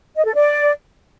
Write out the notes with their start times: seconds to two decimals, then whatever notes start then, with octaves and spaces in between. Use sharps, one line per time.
0.16 D#5
0.25 A4
0.34 D5